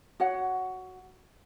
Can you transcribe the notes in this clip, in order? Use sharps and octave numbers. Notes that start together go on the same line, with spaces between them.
F#4 C#5 F#5